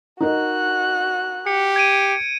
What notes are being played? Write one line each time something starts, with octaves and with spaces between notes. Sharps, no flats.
D#4 F#4 A#4 D#5 F#6
G4 C#7
G#6 D7 D#7